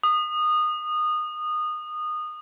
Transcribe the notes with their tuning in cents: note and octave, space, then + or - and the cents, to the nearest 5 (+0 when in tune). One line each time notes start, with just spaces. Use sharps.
D#6 -20